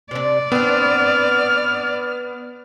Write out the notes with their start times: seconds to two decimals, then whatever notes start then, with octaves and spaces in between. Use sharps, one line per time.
0.11 C3 D4 D5
0.52 B3 C4 D4 F6